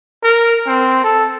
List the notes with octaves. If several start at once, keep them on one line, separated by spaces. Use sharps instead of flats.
A#4
C4
A4